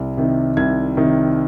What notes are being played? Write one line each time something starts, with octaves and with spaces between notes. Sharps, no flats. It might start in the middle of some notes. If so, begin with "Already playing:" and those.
Already playing: C2
C3 D#3
C2 G#6
C3 D#3